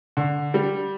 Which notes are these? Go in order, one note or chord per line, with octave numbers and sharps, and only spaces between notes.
D3
G3